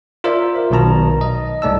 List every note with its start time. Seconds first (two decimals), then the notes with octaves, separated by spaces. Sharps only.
0.24 F4 A#4 C5 D5 E5
0.70 B1 B2 D#3 A5 A#5
1.21 D#5
1.62 C2 G#2 A3 D5 A5 E6